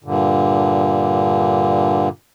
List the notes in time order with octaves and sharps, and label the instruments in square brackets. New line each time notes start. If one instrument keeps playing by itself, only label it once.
[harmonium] G2 A#2 D3